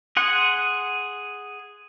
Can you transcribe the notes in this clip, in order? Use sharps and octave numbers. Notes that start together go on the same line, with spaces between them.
G#4 F#5 C6